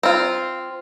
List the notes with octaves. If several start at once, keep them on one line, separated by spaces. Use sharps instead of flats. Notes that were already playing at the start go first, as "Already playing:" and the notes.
C4 F4